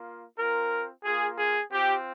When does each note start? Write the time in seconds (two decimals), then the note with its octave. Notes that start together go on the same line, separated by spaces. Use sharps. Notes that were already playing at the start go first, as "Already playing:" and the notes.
Already playing: A#3 F4
0.39 C4 F4 A#4
1.05 A#3 F4 G#4
1.39 G#4
1.71 C4 F4 G4